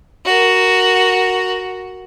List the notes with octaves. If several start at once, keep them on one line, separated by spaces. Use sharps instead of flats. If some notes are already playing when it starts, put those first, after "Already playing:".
F#4 A#4